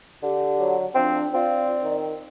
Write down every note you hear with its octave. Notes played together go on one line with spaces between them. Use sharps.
D3 G4
F#3
F3 C4 D4
C4 F4 D5
D#3